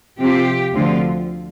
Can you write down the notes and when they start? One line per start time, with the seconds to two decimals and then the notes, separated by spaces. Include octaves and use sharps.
0.19 C3 F3 C4 F4 G4
0.74 D2 D3 F3 C4 F4